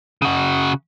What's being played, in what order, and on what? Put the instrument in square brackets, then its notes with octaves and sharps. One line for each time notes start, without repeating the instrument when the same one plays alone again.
[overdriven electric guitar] C#3 F#4